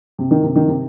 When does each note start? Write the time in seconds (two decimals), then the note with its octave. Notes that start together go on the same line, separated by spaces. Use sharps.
0.19 C3
0.31 D#3
0.43 C3
0.55 D#3
0.68 C3